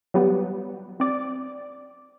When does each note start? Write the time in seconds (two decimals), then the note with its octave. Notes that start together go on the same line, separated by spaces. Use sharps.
0.14 F#3 G3 B3
1.00 C4 D5